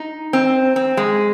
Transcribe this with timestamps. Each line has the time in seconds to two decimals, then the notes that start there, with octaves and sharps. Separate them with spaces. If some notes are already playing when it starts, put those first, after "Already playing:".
Already playing: D#4
0.33 C4
0.76 C4
0.97 G#3